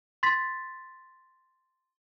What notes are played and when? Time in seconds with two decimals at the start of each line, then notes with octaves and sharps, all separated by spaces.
0.23 C6 A6 B6